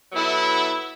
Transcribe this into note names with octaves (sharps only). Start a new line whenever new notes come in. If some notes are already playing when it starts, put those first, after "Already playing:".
F#3 B3 E4 A4